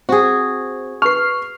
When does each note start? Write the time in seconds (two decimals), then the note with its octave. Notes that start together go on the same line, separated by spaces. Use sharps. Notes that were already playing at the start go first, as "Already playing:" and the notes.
0.09 C4 F#4 G#4
1.02 B4 C#6 F6 C7